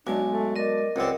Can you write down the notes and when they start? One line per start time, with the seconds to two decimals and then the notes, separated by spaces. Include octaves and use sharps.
0.07 B1 G#3 D4 G#5
0.30 A3
0.56 A#4 D5 D#5
0.96 C#2 G3 C4 F#5